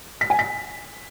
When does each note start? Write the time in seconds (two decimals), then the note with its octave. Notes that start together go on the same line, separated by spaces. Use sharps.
0.21 B6
0.30 G#5
0.39 B6